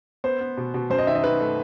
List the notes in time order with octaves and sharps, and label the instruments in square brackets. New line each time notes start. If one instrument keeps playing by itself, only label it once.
[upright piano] B3 C5
B3
B2
B2
F#2 C5
D#5
D#3 E5
D#5
D#3 B4
A3